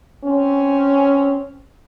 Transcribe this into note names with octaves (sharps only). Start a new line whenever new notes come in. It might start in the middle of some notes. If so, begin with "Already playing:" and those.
C4 C#4